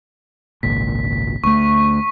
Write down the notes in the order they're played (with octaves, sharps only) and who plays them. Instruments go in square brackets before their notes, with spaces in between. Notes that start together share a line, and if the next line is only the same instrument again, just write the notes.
[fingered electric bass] G#1 C#2 A#2 [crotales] B6
[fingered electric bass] D2 A3 [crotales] C#6